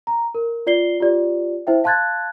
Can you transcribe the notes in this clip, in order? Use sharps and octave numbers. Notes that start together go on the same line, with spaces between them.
A#5
A#4
F4 D5 C7 G7
F4 G4 D5
E4 C5 E5 G5
F5 A5 C6 F#6 G#6 A6